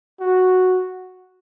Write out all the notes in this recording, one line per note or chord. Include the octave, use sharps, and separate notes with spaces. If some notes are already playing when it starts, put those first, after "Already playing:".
F#4